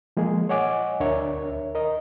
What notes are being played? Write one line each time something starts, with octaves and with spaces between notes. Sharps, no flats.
F3 G#3 A#3 G#4
C#5 D#5 F#5 G#5 D6
D2 D4 A#4 C#5 E5
A#4 D#5